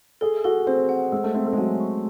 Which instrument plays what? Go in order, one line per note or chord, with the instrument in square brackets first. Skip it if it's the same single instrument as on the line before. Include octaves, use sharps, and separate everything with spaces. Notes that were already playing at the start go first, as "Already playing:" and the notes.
[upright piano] G#4 [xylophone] A4
[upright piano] F#4 [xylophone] A4
[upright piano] C4 [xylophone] C5
[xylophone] F#5
[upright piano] G#3 [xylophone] E6
[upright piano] A3
[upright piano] C4 [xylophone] E5
[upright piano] A3
G#3
[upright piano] F#3 [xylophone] G#5
[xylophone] C#6